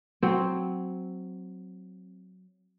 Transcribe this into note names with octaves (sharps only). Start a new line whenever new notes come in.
F#3 C4